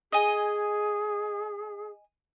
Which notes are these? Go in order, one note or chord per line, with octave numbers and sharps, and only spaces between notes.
G#4 D#5 G#5